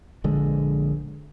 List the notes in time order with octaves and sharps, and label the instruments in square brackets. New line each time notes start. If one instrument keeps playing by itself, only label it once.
[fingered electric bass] A#1 D3 G#3